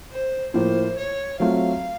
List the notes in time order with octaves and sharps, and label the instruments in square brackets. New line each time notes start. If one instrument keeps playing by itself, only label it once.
[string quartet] C5
[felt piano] A2 F3 A#3 [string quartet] C5
[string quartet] C#5
[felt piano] F#3 A3 C4 F4 [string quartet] F5